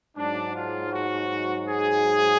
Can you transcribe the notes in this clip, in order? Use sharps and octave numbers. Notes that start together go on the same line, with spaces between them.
G#2 F#3 D4
F4
F#4
G#4